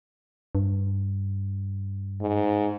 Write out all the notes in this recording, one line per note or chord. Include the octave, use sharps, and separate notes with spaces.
G2
G#2